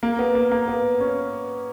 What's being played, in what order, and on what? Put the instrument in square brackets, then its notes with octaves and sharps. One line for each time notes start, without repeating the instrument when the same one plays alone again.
[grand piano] A#3
B3
A#3
A#3
B3
C#4